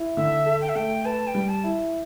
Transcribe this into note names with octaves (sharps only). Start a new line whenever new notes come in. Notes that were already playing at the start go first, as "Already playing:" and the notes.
Already playing: E4
D3 E5
A4
G5
E5
A3 G5
B4 A5
G5
G3
A5
E4